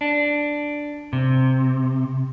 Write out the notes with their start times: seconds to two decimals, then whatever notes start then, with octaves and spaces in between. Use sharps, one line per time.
0.01 D4
1.13 C3